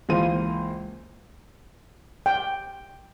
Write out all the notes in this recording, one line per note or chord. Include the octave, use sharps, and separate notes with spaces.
C#2 E3 A#3 C5 F5 D#7
G5